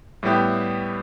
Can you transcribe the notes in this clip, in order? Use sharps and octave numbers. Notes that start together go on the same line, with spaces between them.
A2 G3 B3 E4 G4